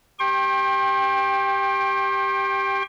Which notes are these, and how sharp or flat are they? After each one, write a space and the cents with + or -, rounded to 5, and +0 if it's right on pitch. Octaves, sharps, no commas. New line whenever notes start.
G4 +0 G5 +15 C6 +45